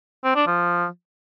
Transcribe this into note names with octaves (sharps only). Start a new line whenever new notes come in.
C4
D4
F3